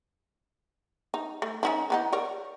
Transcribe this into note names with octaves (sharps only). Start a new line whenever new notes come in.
D#4
A3
C#4 D#4 E4
E3 B3 D#4
A#4 C#5 D5